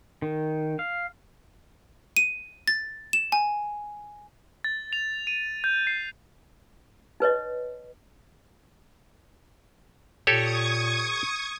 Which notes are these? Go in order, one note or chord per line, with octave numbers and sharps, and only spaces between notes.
D#3
F5
D#7
A6
E7
G#5
A6
F7
D#7
G6
C7
D#4 B4 C#5 D#5
A#2 G4 A4 C#5 C#6 D#6 G#6